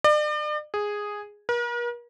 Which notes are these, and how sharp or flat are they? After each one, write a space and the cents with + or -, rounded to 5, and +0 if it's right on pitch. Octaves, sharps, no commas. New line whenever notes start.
D5 +40
G#4 -5
A#4 +45